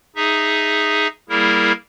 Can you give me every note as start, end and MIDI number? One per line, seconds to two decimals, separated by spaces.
0.16 1.08 63
0.16 1.08 68
0.16 1.08 76
1.29 1.72 55
1.29 1.72 58
1.29 1.72 64
1.29 1.72 68
1.29 1.72 70